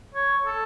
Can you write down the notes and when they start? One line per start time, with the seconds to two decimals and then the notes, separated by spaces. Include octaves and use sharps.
0.14 C#5
0.46 A4